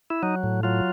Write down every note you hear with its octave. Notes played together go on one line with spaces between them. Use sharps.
E4
F#3 D#4
A2
F#3 F4